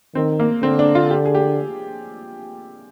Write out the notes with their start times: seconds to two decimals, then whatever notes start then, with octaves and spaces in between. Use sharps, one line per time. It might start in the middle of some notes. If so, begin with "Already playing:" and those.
0.15 D#3 C4
0.40 A#3
0.63 D3 C4
0.79 D4
0.95 F4
1.11 G4
1.25 G#4
1.35 G4